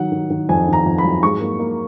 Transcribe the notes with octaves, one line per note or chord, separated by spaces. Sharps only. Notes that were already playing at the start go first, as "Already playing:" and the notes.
Already playing: D#3 F#3 F#5
D#3
D#3
F2 G#5
D#3
A#5
F2
B5
F#3
G#2 C#6
A#3
A#3